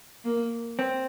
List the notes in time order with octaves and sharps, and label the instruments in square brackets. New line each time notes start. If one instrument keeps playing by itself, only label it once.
[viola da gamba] A#3
[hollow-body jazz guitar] C4